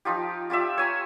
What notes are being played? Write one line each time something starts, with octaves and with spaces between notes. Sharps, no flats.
F3 D#4 F4 G4
F4 G4 D5 E5
C#5 G#5 A#5